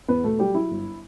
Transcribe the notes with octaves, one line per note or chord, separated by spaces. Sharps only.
E2 B3 B4
B2 A3 A4
F#3 G3 G4
F#3 E4
G1